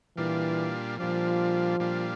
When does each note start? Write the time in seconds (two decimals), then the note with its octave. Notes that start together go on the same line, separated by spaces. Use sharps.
0.17 A#2 E3 G3 D4 F4
0.98 A#2 F3 G3 D4 F4
1.80 A#2 G3 D4 F4